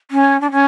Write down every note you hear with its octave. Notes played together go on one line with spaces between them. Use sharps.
C#4
D4
C#4